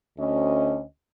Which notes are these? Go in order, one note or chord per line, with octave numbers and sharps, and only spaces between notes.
D2 C#4 D#5